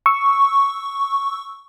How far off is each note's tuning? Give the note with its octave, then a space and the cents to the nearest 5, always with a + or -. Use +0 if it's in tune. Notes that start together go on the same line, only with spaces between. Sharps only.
C#6 +0 E6 -10